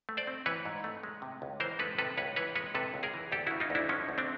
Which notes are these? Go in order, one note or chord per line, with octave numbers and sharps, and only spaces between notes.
A3
C5 D5
C4
E3 B4 C#5
G#2
A3
G#3
C3
C#2
E3 A#4 C5
G#3 A4 B4
C3 A4 B4
C#2 B4 C#5
E3 B4 C#5
G#3 B4 C#5
C3 A4 B4
C#2
G#4 A#4
E3
D2 G4 A4
C#3 E4 F#4
D#4 F4
D2 D4 E4
F3 C#4 D#4
D2
C4 D4